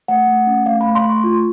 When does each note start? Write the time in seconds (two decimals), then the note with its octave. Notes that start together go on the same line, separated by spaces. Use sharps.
0.08 A3 F#5
0.27 A3
0.47 C#4
0.66 A3 F5
0.81 A3 B5
0.95 C6
1.04 A3 C#6
1.24 F4